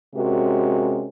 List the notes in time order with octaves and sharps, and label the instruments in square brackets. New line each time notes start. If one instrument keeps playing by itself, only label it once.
[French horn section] C3 G#3 C#4 F#4 A#4